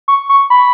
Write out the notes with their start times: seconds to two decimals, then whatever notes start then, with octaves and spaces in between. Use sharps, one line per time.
0.08 C#6
0.29 C#6
0.50 B5